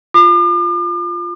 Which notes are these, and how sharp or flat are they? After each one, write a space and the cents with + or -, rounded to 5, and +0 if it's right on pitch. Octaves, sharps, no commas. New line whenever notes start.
F4 +0 D6 +40